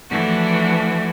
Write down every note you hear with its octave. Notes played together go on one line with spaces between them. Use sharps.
E3 F3 A3 D4 F#4